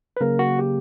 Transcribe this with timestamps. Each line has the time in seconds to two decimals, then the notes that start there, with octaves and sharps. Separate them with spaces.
0.17 B4
0.21 C#3 F#3 A#3 A#4
0.39 F#4
0.59 G4